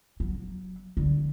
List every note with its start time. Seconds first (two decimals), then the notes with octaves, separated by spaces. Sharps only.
0.20 F#3
0.97 D3